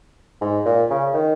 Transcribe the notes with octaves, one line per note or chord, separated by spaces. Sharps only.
G#2
A#2
C#3
D#3